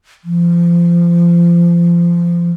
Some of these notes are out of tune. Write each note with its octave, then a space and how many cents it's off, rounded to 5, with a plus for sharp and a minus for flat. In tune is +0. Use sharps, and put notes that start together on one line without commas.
F3 -25